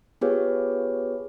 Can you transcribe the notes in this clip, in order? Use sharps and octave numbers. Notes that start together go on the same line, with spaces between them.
B3 F4 G4 G#4 B4 C#5